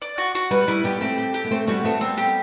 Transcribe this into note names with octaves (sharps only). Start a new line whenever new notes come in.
D5
F#4
F#4
G3 B4
G3 E4
G3 B3 G4
A3 C4 G4
G4
G4
B3
A3 C4 C5
G3 B3 F#4
A3 B3 C4
G3 B3 C4
G4